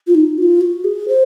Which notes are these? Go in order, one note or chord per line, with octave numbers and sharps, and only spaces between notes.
F4
D#4
F#4
F4
F#4
G#4
C5